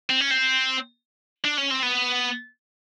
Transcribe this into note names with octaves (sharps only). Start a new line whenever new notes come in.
C4
C#4
C4
D4
C#4
C4
B3